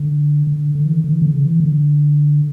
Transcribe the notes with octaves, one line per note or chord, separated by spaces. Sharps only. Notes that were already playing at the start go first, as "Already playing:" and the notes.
Already playing: D3
D3
D3
E3
D3
D3
E3
D3
C#3
E3
D3